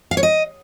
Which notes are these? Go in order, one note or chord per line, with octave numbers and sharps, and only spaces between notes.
F5
C#5
D#5